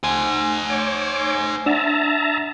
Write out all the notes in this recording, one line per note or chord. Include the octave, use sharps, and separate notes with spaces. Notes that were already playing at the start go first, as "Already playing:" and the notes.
C#2 C5 G#5
C#5 D6
D4 E5 F#5 A5 A#5